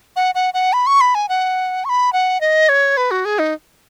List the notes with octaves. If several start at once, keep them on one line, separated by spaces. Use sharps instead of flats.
F#5
F#5
F#5
B5
C#6
B5
G#5
F#5
C#6
B5
F#5
D#5
C#5
B4
F#4
G#4
D#4